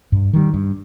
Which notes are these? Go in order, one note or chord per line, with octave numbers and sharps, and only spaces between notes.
G2
D#3 G3
G2